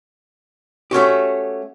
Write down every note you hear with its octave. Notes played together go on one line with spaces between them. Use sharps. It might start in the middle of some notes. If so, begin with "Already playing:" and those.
A3 C#4 F#4 G4